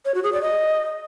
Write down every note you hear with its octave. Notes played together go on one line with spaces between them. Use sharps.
C#5
F#4
G#4
D5
D#5